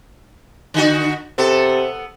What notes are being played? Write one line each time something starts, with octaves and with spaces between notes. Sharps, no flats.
D3 D#4 F#4
C3 B3 A4